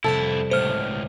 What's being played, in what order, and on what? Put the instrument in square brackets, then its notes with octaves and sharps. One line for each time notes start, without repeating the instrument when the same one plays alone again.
[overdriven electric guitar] F2 E4 [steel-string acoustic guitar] C3 G3 A5 [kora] A4
[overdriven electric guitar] C#2 A2 [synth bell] C5 F6